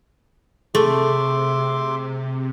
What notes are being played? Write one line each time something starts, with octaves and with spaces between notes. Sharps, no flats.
C3 A3 G#4 E5 C6 D6